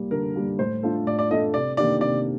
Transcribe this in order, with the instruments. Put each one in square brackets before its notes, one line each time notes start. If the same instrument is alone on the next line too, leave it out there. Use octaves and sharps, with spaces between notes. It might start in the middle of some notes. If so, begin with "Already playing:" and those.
Already playing: [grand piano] G3 A#3
[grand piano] D3 [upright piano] A#4
[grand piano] G3 A#3
[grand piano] A2 [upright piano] C5
[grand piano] A3 D4 F4 A4
[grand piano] A2 [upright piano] D5
[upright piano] D5
[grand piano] A3 D4 F4 A4 [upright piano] D#5
[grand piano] C3 [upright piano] D5
[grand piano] D#3 A#3 D4 G4 [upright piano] D5
[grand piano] C3 [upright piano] D5